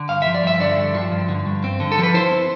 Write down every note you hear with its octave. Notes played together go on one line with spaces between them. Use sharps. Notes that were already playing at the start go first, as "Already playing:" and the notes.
Already playing: D3
G2 F5
E5
F3
D5
G2 E5
D3 D5
G2
F3
G2
D3
G2
C4
D3
A4
F3
B4
E4 C5
C4